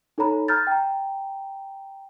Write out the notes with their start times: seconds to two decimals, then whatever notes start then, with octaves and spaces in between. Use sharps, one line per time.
0.18 D#4 A4 C#5 A#5 B5
0.48 A#5 F6 G6 A6
0.67 G5 A#5